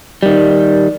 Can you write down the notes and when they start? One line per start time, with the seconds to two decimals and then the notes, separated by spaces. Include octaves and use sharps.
0.23 D#3 G3